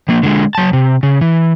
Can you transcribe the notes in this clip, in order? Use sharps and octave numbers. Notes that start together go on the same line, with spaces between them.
F3 A#3
D3 G#3
F#3 A5
C3
C#3
E3